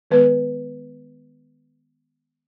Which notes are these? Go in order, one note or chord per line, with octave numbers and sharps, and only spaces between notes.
D#3 G#3 B3 B4